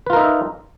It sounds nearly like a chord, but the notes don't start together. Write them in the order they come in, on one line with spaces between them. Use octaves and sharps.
B4 F4 A#4 D#4 E5